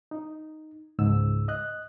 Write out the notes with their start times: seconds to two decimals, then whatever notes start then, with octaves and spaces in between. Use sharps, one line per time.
0.11 D#4
0.99 C#2 G#2 E6
1.48 D#5 F#6